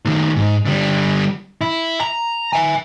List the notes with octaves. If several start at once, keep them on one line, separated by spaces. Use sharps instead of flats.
D#3 A3
G#2
D3 G3
E4
A#5
E5 G#5